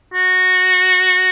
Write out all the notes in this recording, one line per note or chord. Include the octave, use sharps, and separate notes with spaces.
F#4